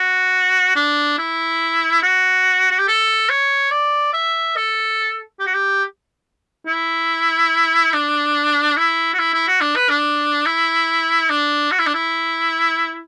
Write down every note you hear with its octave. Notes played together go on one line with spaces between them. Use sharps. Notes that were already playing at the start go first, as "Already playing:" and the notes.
Already playing: F#4
D4
E4
F#4
F#4
G4
A4
C#5
D5
E5
A4
G4
F#4
G4
E4
D4
E4
F#4
E4
E4
F#4
D4
B4
D4
E4
D4
F#4
E4
D4
E4